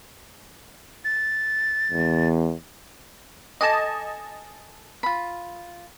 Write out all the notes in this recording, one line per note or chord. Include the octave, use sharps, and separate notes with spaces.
A6
E2
A4 D#5 G#5 A5 D6
F4 B5